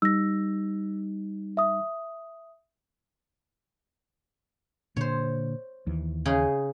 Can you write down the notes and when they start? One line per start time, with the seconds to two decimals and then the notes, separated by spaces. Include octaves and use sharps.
0.02 G3 D#4 E6 A#6
1.57 E5 D#6
4.97 A#2 D3 C5 C#5
5.87 D#2 E3
6.25 C#3 D#4 G#4